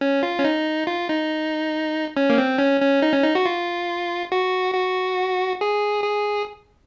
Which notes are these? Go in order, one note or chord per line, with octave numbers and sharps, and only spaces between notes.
C#4
F4
C#4
D#4
F4
D#4
C#4
A#3
C4
C#4
C#4
D#4
C#4
D#4
F#4
F4
F#4
F#4
G#4
G#4